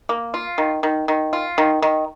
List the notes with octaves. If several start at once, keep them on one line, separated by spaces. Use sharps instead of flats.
A#3
F4
D#3
D#3
D#3
F4
D#3
D#3